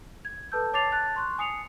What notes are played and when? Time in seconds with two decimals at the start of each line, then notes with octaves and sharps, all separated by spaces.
0.25 G#6
0.52 A4 B4 A5 E6 G6
0.73 C#5 A5 D6 A6 C7 F7
0.92 A5 F#6 A6
1.16 C6 C#6 F#6
1.38 G#5 D#6 C7 C#7 F7